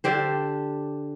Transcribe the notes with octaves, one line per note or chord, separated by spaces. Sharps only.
D3 D4 G4 C5